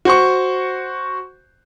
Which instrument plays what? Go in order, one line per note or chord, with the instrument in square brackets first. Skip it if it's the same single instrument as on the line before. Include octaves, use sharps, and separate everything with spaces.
[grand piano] F#4 C5 C#6